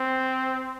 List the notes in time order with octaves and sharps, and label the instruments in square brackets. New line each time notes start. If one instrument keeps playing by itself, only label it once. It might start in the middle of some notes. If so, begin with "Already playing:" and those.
Already playing: [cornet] C4